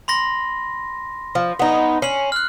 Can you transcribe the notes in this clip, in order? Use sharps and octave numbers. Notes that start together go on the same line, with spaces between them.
B5 C6 A#6
F3
B3 D#4
C#4 C7 F#7
F6 F#6